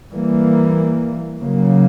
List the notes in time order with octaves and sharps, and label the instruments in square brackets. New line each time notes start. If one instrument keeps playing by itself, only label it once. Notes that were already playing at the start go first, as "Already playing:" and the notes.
[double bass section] E3 G3 A#3
C#3 F#3 A#3